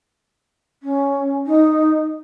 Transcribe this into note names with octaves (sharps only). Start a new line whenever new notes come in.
C#4
D#4